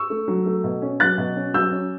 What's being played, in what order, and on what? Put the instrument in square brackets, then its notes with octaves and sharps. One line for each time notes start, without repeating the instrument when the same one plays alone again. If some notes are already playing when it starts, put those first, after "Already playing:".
Already playing: [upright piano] C#6 E6
A3
F#3
A3
B2
C#4
F#3 F#6 A6
B2
C#4
F#3 E6 G6
C#4